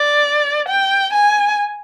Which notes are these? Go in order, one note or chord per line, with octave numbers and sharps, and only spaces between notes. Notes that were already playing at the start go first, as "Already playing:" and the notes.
Already playing: D5
G5
G#5